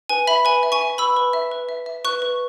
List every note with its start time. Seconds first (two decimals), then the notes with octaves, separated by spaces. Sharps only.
0.09 B4 G#5
0.27 E5 B5
0.45 B4 G#5
0.63 E5
0.72 G#5 C#6
0.81 E5
0.98 B4 B5 E6
1.17 B4
1.33 E5
1.52 B4
1.69 E5
1.86 E5
2.04 B4 C#6 F#6
2.22 B4